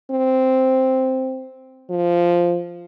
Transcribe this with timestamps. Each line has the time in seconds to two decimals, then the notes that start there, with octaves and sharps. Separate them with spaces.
0.11 C4
1.90 F3